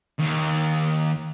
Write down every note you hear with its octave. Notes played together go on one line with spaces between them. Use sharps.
D#2